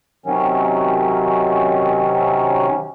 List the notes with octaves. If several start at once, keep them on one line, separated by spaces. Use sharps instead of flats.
C3 D#3 F#3 C#4